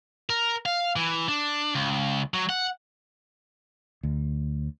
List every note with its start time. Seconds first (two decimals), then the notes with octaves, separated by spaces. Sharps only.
0.30 A#4
0.66 F5
0.96 E3
1.29 D4
1.75 C#2
2.34 F#3
2.49 F#5
4.03 D2